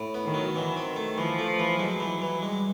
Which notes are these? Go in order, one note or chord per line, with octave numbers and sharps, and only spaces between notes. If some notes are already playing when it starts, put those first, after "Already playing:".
Already playing: A2
B3
D#3
F#3
D#3 E3
C4
A3
E3 F3
A3
E3
F#3 G#3
E3
E3
G3 G#3